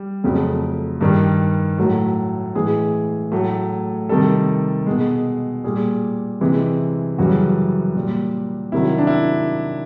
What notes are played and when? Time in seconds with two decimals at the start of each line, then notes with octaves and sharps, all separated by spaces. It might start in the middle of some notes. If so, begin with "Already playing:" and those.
Already playing: G3
0.24 F2 C#3 F#3 A3
1.01 G2 D#3 G3
1.78 A2 F#3 A3
2.55 A2 E3 G#3 G#4
3.32 A2 F#3 A3
4.09 C3 D#3 G3 A4
4.87 B2 G#3
5.64 A#2 G3 G#4
6.41 C3 E3 G#3
7.18 F#2 C#3 E3 G3 F#4
7.96 A#2 G3
8.72 C3 D#3 F#3 E4
8.98 D4
9.07 E4